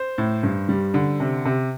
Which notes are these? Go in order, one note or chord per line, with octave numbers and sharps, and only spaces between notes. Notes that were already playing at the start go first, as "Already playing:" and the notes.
Already playing: C5
A2
G2
G3
D3
C3
C3